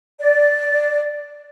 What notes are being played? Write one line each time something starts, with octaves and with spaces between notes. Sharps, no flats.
D5